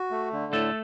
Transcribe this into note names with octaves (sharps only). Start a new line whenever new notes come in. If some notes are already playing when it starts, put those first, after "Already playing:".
Already playing: F#4
A3
D3
A2 A3 A4